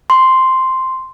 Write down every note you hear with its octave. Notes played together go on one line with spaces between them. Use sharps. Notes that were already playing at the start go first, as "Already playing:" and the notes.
C6